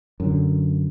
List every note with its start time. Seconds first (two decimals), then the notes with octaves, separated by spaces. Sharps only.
0.20 F#2 D3